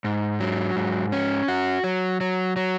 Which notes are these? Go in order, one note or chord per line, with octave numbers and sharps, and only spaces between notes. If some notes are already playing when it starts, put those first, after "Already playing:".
G#2
F#3
G#2
C#4
F#4
F#3
F#3
F#3